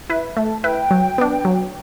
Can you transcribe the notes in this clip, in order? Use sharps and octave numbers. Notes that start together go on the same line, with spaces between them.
E4 B4
A3 A5
E4 B4 G5
F#3
B3 D4
F#3